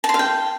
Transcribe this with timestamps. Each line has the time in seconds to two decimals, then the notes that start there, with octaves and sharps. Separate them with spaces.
0.04 A5
0.09 C6
0.14 F5
0.19 G5